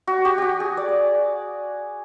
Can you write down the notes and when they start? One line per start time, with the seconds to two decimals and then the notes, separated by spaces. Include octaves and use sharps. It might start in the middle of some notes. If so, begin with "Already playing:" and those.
0.07 F#4
0.25 G4
0.38 F#4 G4
0.60 G#4
0.77 D5